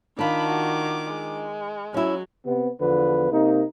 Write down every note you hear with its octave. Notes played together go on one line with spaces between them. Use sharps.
D#3 D4 F4 B5 D6
F#4
G#3
F#3 C#4 E4
C3 B3
E2 D3 F3 B3 B4
C3 A#3 D#4